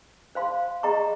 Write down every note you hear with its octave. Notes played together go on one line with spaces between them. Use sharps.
C5 F5 C6
G#4 D#5 A#5 C#6